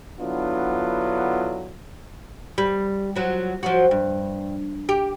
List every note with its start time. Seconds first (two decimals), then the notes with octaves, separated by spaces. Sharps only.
0.19 D3 F#3 B3 D4 E4 F4
2.58 G3
3.16 F3 F#3
3.63 F3 F#3 F#4
3.91 G2
4.89 G4